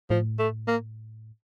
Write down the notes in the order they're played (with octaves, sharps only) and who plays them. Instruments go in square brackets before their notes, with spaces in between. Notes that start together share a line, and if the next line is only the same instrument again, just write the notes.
[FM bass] A2 [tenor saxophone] F3
[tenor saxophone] A3
A#3